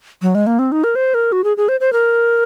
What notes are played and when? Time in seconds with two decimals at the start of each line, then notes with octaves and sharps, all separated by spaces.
0.22 F#3
0.35 G#3
0.47 A#3
0.59 C4
0.72 D#4
0.84 A#4
0.95 C5
1.14 A#4
1.32 F#4
1.44 G#4
1.57 G#4
1.69 C5
1.80 C5
1.93 A#4